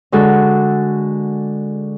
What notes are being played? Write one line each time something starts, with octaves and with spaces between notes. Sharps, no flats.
D3 G#3 F#4 A4